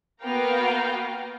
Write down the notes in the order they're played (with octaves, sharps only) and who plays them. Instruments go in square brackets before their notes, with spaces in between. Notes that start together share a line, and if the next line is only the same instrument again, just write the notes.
[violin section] A#3 B3 F#4 F5 G5 A#5